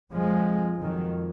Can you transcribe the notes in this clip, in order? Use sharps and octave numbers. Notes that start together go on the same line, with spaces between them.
F2 F3 G#3
F2 D#3 F#3